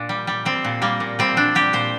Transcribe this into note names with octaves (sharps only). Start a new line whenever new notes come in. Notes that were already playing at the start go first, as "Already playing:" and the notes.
Already playing: A#2 D4
G3
G3
G3 C4
A#2
G3 A#3
A#2
G3 C4
G3 D4
G3 G4
A#2 C5